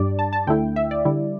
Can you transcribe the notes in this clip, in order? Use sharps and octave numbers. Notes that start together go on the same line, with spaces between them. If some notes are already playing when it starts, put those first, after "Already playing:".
Already playing: G2 G3 D4 D5
A5
A5
D2 D3 A3 E4 G5
E5
D5
D3 G3 E4